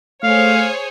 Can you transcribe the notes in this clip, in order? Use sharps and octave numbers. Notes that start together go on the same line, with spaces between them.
A3 G#4 C5 C#5 F5